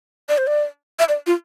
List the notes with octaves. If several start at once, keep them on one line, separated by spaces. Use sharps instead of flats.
D5
C5
D5
E5
D5
F4